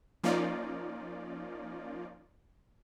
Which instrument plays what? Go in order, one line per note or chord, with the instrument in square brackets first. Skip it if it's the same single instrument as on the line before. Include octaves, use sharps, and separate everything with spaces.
[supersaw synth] F3 A#3 C#4 D#4 F4 D5